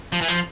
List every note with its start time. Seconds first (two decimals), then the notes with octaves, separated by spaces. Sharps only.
0.13 F3
0.21 E3
0.28 F3